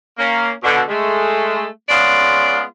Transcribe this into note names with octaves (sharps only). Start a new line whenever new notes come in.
A#3 C#4
B2 D3
G#3 A3
G#3 B3 C#4 F4 G#4 D5